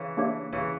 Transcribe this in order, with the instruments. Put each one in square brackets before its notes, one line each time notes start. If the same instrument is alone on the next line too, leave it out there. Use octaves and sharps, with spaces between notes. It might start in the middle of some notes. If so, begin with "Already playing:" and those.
Already playing: [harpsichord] C#3 E3
[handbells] A#3 D4 G4 C#5 E5
[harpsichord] C#3 E3